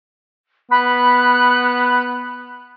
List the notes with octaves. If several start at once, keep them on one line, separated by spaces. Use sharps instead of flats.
B3 B5 F#6